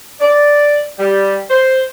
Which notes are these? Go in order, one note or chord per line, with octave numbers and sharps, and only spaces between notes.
D5
G3
C5